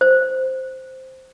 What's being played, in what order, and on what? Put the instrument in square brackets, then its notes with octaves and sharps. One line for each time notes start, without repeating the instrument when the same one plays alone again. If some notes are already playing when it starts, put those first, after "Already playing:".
[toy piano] C5